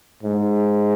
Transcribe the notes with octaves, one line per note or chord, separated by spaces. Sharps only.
G#2